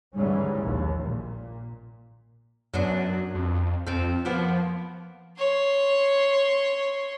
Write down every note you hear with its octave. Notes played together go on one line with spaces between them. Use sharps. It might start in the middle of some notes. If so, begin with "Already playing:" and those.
D2 G#2 E3 G3 C#4
A#1 D#2
A#2
F#2 F#3 B3 D4
F2
F2 F3 C4
F3 A#3 B3
C#5 C6